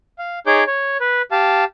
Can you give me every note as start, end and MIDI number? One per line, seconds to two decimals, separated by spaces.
0.19 0.39 77
0.47 0.64 63
0.47 0.64 68
0.47 0.64 73
0.47 0.64 86
0.47 0.64 91
0.67 0.97 73
1.01 1.22 71
1.32 1.64 67
1.32 1.64 77
1.32 1.64 81